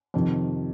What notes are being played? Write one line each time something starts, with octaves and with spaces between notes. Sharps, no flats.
F2 C3 D#3